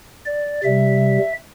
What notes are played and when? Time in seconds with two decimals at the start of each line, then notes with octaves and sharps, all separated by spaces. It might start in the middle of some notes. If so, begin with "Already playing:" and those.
0.26 D5
0.64 C3 G3 E5